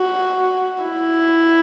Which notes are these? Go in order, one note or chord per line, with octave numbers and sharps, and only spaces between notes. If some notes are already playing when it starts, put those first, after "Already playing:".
Already playing: F#4
E4